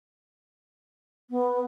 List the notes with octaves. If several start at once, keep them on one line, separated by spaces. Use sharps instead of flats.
B3